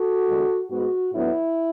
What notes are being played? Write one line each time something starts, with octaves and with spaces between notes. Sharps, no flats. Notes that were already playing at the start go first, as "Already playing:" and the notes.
Already playing: F#4 A4
E2 D3 G#3
G#2 G#3 B3 F#4
A2 F#3 B3 D4 E4